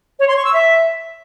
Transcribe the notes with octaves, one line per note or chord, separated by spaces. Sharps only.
C#5
C6
C#6
E6
E5